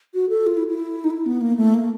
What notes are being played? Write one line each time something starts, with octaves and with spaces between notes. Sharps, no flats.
F#4
A4
F4
E4
E4
D#4
E4
B3
A#3
A3
A#3